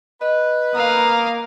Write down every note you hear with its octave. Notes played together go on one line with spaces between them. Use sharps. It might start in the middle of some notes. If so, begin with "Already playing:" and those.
B4 D#5
A#3 F5 A#5 D#6